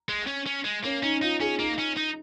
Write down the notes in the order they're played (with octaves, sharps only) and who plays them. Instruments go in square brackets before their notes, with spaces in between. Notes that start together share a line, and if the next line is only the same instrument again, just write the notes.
[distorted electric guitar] G#3
C#4
C#4
G#3
[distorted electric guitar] A#3 [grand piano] C#4
[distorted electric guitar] C#4 [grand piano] D#4
[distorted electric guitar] D#4 [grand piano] F4
[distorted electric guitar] C#4 [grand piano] G#4
[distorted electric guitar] A#3 [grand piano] D#4
[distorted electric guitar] C#4
D#4